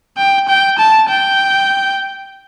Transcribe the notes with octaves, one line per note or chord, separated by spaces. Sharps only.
G5
G5
A5
G5